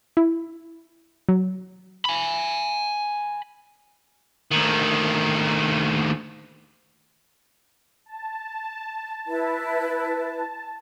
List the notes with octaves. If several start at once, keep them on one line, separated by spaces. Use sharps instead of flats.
E4
F#3
G#5 B5
D2 D#3
A5
E4 B4